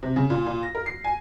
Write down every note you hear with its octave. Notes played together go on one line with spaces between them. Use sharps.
C3
C#3
A#2
A#2
A#6
A#4
C7
G#5